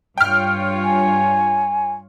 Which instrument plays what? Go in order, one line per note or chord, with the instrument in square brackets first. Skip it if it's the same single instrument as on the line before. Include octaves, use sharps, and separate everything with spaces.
[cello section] G2 F4 C#5 [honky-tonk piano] G5 F6
[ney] G#5